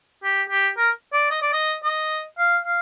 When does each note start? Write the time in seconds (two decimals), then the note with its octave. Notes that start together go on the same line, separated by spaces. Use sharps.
0.24 G4
0.50 G4
0.77 A#4
1.13 D5
1.31 D#5
1.42 D5
1.53 D#5
1.84 D#5
2.39 F5
2.65 F5